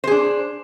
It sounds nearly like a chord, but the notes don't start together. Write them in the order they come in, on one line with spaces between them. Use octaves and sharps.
C5 G#4 D4